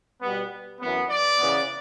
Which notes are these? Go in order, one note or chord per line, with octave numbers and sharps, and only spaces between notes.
B2 G3 B3
F#2 E3 B3
D5
C#3 E3 B3